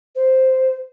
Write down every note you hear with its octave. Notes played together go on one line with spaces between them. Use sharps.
C5